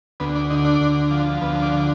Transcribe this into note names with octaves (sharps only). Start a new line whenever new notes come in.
D2 B3
D4
D3 D#4
D4
D2
F3
D2 B3
D4
D3